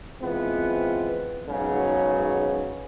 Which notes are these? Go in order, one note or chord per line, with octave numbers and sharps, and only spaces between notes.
E3 G#3 B3 C4 F4
B1 G#2 C#3 F#3